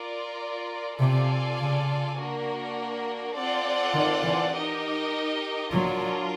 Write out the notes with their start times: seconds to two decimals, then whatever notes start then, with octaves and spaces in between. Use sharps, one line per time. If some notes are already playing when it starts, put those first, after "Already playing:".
Already playing: F4 A#4 D5
0.99 C3 F4 A4 D5 F5 G#5
1.58 C#3
2.18 A#3 D4 F#4 A#4
3.35 C4 F4 A4 D5 F#5
3.94 D#3
4.23 E3
4.53 D#4 G4 A#4 D#5
5.70 F#3 D4 F4 A#4